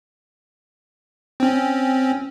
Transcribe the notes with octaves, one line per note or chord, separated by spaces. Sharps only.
C4 C#4